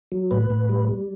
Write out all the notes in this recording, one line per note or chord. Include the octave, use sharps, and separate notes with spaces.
F#3
A2 B4
A2
G3
G3